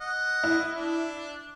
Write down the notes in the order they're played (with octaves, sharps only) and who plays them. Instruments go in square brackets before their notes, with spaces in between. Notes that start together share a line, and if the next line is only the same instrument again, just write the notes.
[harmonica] D#5 F#5
[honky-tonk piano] E4
[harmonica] D4